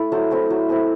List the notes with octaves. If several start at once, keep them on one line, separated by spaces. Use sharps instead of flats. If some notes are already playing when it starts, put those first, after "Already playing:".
Already playing: A3 E4
F#3 A4 C5
A3 C4 E4
F#3
A3 C4 E4